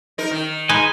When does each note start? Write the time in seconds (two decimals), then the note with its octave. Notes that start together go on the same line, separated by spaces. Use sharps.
0.18 D#4 A#4
0.31 D#3
0.69 G#3 D#4 B4 D#5 G#5